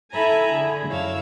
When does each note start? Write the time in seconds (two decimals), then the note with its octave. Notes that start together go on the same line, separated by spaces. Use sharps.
0.13 E4 A4 E5 G#5 A#5 B5
0.52 D3 G#4
0.88 F#2 E4 C#5 F5 E6